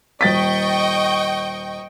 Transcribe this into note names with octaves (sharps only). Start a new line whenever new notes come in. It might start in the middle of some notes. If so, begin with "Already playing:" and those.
D#1 D#5 G5 C#6 A6 B6